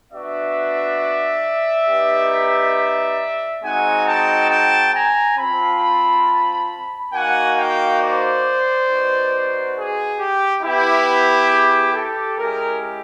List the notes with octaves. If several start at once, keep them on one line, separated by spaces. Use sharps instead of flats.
B3 D4 F#4 D5 E5
B3 D#4 G4
G#3 C4 D#4 F#4 F#5 G#5
G5 A5
G5 A5
G#5 A#5
C4 F4 A5 B5
A#3 D#4 F#4 F#5 G#5
F5 G5
C5 D5
B3 D#4 F#4
G#4
G4
B3 E4 G4
G#4
G4 A4
G#3 C#4 E4 G4 G#4 A#4